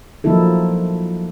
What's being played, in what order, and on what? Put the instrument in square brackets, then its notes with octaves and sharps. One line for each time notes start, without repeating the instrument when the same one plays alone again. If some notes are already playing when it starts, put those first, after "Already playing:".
[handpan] F3 F#3 A#3 D#4 E4 A4